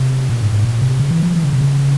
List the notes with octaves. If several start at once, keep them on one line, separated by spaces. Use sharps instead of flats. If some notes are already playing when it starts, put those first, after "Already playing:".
Already playing: C3
A#2
G#2
G#2
A#2
C3
C#3
E3
F3
E3
C#3
C3
C#3